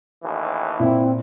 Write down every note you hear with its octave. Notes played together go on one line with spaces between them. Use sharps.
A1 D#2 E3
A#2 C4 E4